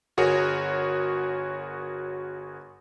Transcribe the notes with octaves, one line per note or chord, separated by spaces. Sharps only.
G1 F#4 G#4 A#4 C#5